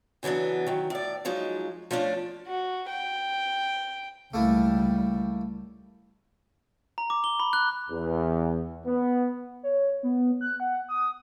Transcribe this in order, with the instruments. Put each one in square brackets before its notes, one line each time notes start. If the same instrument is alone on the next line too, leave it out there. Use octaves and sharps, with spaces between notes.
[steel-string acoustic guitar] C#3 E3 F#3 B3 D4
D#3 F#3
A2 D5
F3 F#3 G#3 D#4
F3 A3 C#4 D4
[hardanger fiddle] F#4
G5
[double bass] C#2 G3 [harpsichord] A3 A#3 E4
[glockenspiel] A#5
D6
G7
B5
F#6
[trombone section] E2
B3
[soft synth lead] C#5
B3
F#6
F#5
D#6